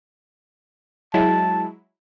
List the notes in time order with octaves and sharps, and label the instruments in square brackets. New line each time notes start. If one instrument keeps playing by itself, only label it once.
[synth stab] F#3 G#3 E4 [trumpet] A5